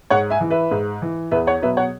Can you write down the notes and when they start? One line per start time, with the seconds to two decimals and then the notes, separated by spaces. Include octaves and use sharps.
0.10 G#2 C#5 F#5
0.30 E5 G#5
0.41 E3
0.50 B4 E5
0.71 G#2
1.02 E3
1.31 E2 B4 E5
1.47 C#5 F#5
1.62 B2 F#3 B4 E5
1.77 C#5 F#5